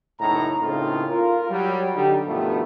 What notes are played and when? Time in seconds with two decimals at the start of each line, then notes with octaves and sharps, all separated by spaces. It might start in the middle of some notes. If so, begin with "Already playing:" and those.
0.20 F#1 A2 D#4 A#5
0.61 A2 C#3 A#3 C4 D#4 F4
1.09 F4 A#4
1.50 F#3 G3
1.95 D3 G3 D#4
2.27 G2 B2 D#3 F3 A3 B3